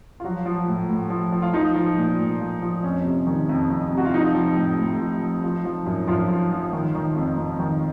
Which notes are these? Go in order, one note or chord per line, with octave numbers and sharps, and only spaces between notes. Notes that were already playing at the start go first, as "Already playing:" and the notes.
F4
F3 F#3 F#4
F3
A2
A2
F3
F3
F4
F3 D#4
F3
A#2
A#2
F3
F3
F2 C#4
C3
D#3
F2
F2
C3
F#4
F4
F3 D#4
F3
A2
A2
F3
F3
F3
F3
F#2
F#2 F3 F4
F3
F3
D#3
D#3
F2
F2
D#3